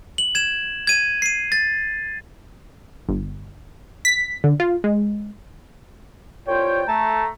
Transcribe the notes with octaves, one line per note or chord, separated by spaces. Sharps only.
F#7
G#6 E7
G#6 D#7
C7 D#7
A6
G1
B6
D3
F4
G#3
C2 F4 C#5 G5
A3 A5 A#5